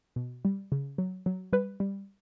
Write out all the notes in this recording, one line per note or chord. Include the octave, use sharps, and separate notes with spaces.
B2
G3
C#3
F#3
F#3
G3 B4
G3